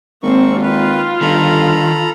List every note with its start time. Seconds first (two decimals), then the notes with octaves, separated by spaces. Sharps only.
0.23 G#1 A#3 C4 C#6
0.62 D#3 F4 B4
1.21 G1 D#3 A4 A#5 B5